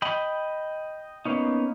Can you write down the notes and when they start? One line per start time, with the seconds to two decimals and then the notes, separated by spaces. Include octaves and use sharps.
0.02 D#5 G5 B5
1.25 A#3 B3 C#4 D#4